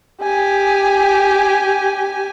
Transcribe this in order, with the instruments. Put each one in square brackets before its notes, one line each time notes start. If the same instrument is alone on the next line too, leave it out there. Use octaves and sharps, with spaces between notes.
[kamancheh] G4 G#5